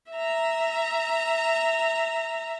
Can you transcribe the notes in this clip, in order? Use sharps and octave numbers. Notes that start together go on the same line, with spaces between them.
E5 A#5